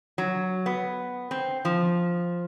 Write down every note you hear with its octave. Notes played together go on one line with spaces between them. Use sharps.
F#3
B3
C4
F3